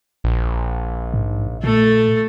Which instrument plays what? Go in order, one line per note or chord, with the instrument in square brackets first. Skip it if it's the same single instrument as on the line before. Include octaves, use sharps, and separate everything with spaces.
[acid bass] A#1
[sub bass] G#2
[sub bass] A#2 [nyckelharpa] A3 A4